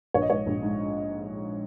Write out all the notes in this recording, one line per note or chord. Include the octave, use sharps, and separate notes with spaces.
A#1 C#5
D#5
G#2 C#5
A#1
G#2